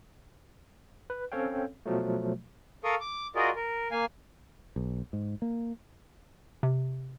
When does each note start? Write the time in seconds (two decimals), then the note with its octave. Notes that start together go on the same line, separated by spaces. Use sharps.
1.10 B4
1.32 C4 C#4 A4 C#5 F5 G5
1.86 B2 F3 F#3 A3
2.84 A4 A#4 F5 C#6 D#6
3.01 D6
3.36 F4 F#4 G#4 A#4 D5 D#5
3.56 A#4
3.91 A#3 F5 G#5
4.76 B1
5.13 G#2
5.42 A#3
6.63 C3